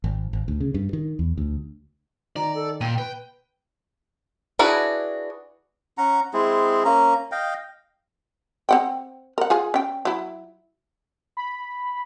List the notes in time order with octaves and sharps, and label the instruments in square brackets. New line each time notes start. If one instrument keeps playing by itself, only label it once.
[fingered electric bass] G#1
G#1
D2
C#3
G2
D#3
E2
D2
[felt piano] D#3 [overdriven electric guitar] D5 [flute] A#5
[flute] A4
[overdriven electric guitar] A#2 [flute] G5 [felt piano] D#7
[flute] B4 [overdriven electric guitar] G5
[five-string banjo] D4 E4 F#4 G#4 B4
[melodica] C#4 F#5 A#5
G#3 C4 E4 G#4
A#3 C#4 A#5
D#5 F5 G5
[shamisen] C4 F#5 G5
A#4 F#5
F4 G#4 G#5
C#4 G5
F#3 E4
[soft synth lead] B5